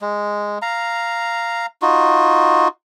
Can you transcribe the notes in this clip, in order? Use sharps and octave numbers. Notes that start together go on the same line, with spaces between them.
G#3
F5 A#5
D#4 F4 F#4